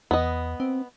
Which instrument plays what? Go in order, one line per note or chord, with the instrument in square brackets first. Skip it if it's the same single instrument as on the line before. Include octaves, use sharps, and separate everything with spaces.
[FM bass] E2 [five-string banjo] B3 D#5
[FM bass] C4